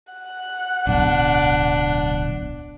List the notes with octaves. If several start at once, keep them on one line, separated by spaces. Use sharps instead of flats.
F#5
D1 B1 D4